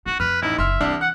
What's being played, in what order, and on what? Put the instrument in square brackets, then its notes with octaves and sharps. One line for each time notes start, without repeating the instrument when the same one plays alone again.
[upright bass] D#4 [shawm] F#4
[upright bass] F2 [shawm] B4 [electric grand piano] F6
[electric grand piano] A1 D#4 [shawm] E4
[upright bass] F#1 [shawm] E5 [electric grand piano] C6 F6
[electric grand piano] C2 D4 F6 [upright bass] E3
[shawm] F#5 [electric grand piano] F#6